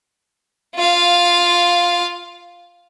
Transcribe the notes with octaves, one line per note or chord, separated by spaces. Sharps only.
F4 F5